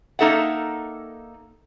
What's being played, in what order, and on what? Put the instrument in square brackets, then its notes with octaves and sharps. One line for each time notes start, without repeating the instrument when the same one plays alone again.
[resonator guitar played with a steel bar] A#3 D#4 A4 E5 F#5